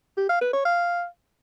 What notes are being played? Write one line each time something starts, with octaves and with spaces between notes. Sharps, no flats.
G4
F5
B4
C#5
F5